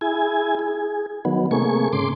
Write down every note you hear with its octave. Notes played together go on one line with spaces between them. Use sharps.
E4 G#4 G#5
G#4
D#3 F#3 B3
C3 A3 A#3 G#4 C#6
G#2 C#3 C6 D6